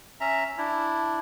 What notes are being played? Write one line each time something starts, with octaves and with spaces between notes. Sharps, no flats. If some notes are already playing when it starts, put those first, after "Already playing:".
C#4 E5 A#5
D4 E4